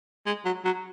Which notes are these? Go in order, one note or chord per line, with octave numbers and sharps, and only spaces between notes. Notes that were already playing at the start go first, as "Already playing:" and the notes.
G#3
F#3
F#3